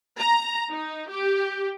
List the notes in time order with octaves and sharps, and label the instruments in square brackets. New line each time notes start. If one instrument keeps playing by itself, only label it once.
[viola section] A#5
D#4
G4